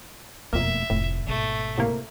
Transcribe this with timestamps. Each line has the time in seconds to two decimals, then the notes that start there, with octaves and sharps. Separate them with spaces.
0.53 E1 F2 A3 A#3 E5
0.90 F1 A2
1.27 G#1 B2 A3
1.78 A2 C3 A#3